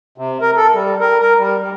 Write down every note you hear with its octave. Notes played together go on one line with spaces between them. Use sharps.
C3
A#4
A4
G3
A#4
A#4
G3
G3